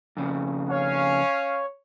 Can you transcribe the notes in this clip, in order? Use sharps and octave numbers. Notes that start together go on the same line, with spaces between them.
F2 C#3
C#4 C#5 F5